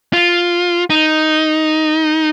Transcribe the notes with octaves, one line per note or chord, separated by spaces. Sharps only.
F4
D#4